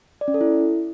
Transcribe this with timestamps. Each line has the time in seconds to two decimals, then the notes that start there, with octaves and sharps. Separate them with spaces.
0.21 D5
0.28 C#4
0.34 A4
0.41 E4